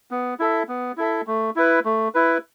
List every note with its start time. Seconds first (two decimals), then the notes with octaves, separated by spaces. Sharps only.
0.11 B3
0.40 E4 A4 E5
0.69 B3
0.97 E4 A4 E5
1.27 A3
1.56 E4 B4
1.85 A3
2.15 E4 B4